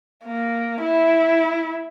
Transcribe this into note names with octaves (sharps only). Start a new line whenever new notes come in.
A#3
E4